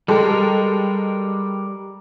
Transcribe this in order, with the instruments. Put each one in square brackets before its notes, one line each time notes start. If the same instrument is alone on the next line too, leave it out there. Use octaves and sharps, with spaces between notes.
[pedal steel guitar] G3 A#4 [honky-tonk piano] G#3 G4 A4